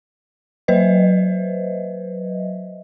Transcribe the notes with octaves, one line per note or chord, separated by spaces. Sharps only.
F#3 B4 C5 D#5 E5